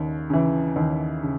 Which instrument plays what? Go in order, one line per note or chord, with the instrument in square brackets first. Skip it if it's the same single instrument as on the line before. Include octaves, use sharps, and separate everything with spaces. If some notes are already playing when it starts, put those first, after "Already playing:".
Already playing: [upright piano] D#2 C#3
C#3 E3
D#2
C#3